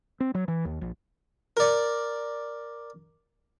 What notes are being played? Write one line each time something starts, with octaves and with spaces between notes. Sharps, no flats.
C4
F#3
E3
D#2
A#1
A#4 D5